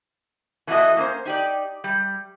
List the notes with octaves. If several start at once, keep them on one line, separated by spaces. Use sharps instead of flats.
E3 G#3 A3 B3 F#4 D#5
A#3 C#4 C5
D#4 G4 D5
G3